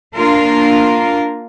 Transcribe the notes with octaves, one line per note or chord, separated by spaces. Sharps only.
A#3 D4 F4 A#4